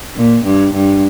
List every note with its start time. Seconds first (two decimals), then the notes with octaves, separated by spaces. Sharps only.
0.16 A#2
0.45 G2
0.74 G2